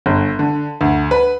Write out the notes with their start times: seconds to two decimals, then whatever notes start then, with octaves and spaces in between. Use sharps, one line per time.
0.06 G1
0.39 D3
0.81 D2
1.11 B4